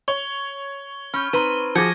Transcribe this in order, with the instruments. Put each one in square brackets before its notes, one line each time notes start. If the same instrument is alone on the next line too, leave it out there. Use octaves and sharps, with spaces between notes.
[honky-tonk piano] C#5 [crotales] G7
[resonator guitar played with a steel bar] C#4 [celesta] B5 G6 [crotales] C#6 F6
[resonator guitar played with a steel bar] C4 B4 [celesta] D#4 A#5 C6 [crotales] D#7
[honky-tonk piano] F3 [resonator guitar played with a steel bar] F#4 G#4 [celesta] D6 C#7 [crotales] G#6 A#6